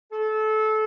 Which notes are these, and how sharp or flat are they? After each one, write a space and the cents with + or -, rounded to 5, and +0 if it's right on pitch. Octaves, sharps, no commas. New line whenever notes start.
A4 -25